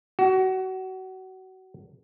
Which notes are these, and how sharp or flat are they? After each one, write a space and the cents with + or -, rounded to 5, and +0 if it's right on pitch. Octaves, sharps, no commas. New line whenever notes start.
F#4 +25